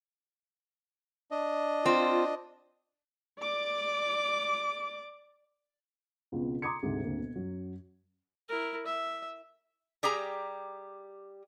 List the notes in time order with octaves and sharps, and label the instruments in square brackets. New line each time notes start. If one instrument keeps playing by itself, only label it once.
[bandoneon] D4 D#5
[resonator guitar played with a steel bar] C4 [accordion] F4
[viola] D5 D6
[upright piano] C#2 B2 C4
A#5 C6 D6 D#6 G#6 C#7
D2 G#2 C3
D2 A#3 C4
B2
F#2 F#3
[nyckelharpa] E4 A#4
E5
[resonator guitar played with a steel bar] G3 G4 G#4 A#5